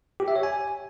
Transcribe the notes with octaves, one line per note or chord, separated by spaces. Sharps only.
G4
E5
C#5
G#5